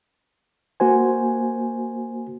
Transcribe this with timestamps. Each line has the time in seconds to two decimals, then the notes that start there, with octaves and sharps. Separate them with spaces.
0.80 A#3 F#4 C5 G#5